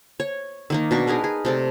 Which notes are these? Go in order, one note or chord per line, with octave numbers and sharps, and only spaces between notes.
C#5
D#3 A#3 D#4
B2 D4 C#6
D#4 G#4 A#4 B4
G#4
C3 A3 D5